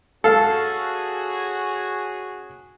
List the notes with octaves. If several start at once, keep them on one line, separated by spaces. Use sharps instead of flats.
C#4 F#4 G#4 A4 F5